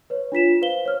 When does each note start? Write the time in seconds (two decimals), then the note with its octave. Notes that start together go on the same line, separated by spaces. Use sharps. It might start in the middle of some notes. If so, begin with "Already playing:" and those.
0.10 B4 C#5
0.32 D4 F4 B6 E7
0.62 B4 C5 F5 G7
0.85 C#5 F6